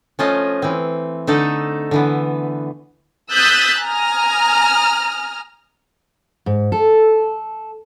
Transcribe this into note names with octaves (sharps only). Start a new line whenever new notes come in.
F3 A3 C#4 F4 D#5
E3 C4
D3 A3 D#4 A4
D3 E3 B3
D#6 E6 F#6 G6 A6 B6
G#5 A#5 D#6 F6
G#2
A4